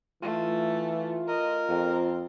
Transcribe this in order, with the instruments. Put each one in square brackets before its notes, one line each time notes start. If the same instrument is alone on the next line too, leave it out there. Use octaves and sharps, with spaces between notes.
[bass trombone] E3 [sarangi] A3 [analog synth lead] F4
[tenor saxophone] A#4 [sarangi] D#5
[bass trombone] F2 [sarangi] C4